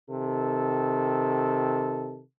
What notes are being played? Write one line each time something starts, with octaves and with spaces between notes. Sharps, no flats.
C3 D#3 A4